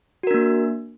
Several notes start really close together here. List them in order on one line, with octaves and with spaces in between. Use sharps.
F#4 A#4 D4 A#3